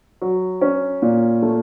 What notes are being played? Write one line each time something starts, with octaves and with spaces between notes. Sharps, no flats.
F#3
C#4
A#2
A3